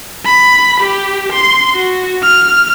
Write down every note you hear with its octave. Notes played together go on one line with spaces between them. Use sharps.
B5
G4
C6
F#4
F6